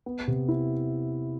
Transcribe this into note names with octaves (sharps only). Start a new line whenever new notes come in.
B3
C3
E4